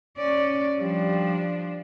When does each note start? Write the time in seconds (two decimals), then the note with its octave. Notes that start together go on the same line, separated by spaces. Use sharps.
0.17 C#4 D5
0.80 F3 G3 D4